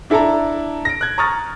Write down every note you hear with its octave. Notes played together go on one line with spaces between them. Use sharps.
D4 E4 A4 D5 A5 A#5
A#6 D7
F#6 G#6
A#5 C#6 D#6 F6 A6